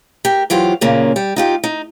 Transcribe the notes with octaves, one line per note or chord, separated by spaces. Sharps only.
G4 A#4
E3 F#3 F4 G4 C5
A#2 C#3 A#3 C#4
G3
D#4 F4 G4
D#4